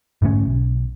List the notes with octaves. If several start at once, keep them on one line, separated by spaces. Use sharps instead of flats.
G#2 D3 A3 C#4
B1